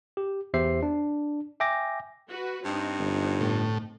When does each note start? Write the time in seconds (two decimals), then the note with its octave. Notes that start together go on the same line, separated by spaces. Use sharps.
0.17 G4
0.54 E2 G4 C5 E5 C7
0.83 D4
1.60 E5 G5 G#5 D6 A#6
2.28 F#4 B4
2.65 G2 C4 D#4
3.00 G1
3.40 A2